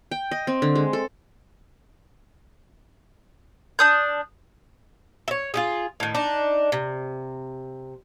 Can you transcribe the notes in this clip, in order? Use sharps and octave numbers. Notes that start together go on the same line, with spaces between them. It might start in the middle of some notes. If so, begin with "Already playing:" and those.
G5
D#5
C4
D3
G#3
A4
D4 D#6 G6
C#5 E5
F4 G4 G#4
A2 D#3
D4 D#4
C3